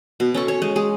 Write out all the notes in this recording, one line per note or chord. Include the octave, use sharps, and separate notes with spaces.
B2
C#4 A4 C#6
C#5
G#3
G#3 G#4